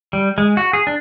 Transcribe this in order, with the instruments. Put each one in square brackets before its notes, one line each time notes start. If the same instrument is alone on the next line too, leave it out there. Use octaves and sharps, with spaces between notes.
[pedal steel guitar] G3
G#3
F#4
G#4
D4